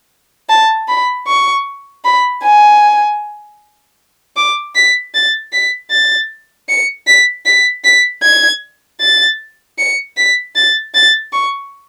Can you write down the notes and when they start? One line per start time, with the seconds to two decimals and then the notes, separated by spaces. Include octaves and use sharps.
0.50 A5
0.89 B5
1.27 C#6
2.05 B5
2.43 G#5
4.36 D6
4.75 B6
5.14 A6
5.53 B6
5.91 A6
6.69 C#7
7.07 B6
7.46 B6
7.84 B6
8.23 G#6
9.01 A6
9.78 C#7
10.17 B6
10.56 A6
10.94 A6
11.33 C#6